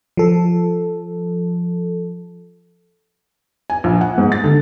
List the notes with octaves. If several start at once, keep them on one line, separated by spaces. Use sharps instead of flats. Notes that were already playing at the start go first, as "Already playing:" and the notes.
F3 A4
G#5
A#1
F#5
G#2
A6
D3